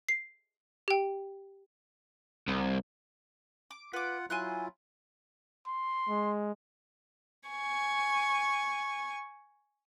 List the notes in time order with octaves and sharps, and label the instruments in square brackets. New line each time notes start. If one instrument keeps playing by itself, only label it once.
[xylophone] C7
G4 G5
[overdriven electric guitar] C2
[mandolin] D6
[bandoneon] F4 F#5 [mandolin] B4 D6
[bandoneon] F#3 E4 F4 [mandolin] G#5 C6 F#6
[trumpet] C6
[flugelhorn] G#3
[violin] G#5 C#6